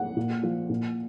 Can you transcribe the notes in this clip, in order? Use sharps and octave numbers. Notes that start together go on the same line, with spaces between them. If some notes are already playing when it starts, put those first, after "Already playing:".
Already playing: F#5
A#2
F3
A#2